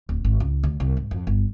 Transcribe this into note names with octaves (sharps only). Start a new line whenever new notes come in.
D1
G#1
C#2
D2
C2
G#2
F2
G1